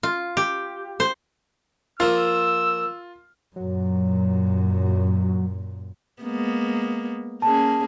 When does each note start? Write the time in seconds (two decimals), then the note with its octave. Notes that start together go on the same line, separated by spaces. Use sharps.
0.03 F4
0.37 G4
1.00 C5
2.00 F3 A#3 F4 E6
3.56 F#2 A#2 F#3
6.23 G#3 A#3 B3
7.42 A#3 C#4 G#4 A5